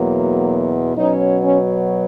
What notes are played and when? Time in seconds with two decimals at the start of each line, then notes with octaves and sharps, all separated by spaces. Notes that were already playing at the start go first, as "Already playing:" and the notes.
Already playing: E2 B2 F#3 A#3
0.96 B2 F#3 C#4 D#4
1.42 C#4